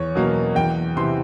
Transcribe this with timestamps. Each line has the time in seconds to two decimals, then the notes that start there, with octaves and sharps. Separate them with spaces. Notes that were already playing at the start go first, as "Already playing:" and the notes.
Already playing: E2 C#5
0.15 B2 F#3 A#3
0.55 E2 G5
0.96 C3 E3 C6